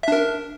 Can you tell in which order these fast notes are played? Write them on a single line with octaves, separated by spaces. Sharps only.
E5 D4 A#4